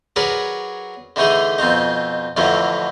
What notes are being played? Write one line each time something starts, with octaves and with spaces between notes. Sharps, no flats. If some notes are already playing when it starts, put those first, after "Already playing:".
F#3 G#4 A#4 B4 C#5 D5
D3 E3 A3 D#4 G#4
F2 B2 C4 D#4
F2 A2 D3 E3 F#3 A3